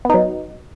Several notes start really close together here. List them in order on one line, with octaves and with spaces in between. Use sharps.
B3 D#4 F#3